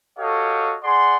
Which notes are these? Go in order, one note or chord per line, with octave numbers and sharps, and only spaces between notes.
F#4 G4 A4 C#5 D#5 F5
G#4 D5 F#5 C6